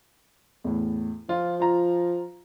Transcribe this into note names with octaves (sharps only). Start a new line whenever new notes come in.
E2 A2
F3 F4
F4 A#5